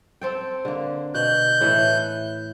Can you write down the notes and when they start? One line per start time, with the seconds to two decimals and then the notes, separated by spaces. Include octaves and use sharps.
0.21 C4 A4 G5
0.65 D3 A#3
1.15 B2 F#6 G6
1.61 A2 E3 A4